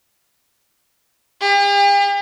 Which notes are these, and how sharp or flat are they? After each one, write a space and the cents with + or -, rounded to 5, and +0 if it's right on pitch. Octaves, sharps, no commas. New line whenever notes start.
G4 +45